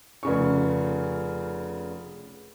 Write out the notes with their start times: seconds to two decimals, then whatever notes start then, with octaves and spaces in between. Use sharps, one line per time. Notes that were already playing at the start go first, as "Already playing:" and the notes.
0.23 F1 C#3 C#6